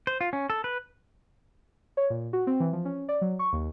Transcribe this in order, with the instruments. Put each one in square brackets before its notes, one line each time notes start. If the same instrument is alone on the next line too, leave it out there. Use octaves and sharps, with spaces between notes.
[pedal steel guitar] C5
F4
C#4
A4
B4
[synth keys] C#5
A#2
F#4
C4
E3
F3
C#4
D5
F#3
C#6
D#2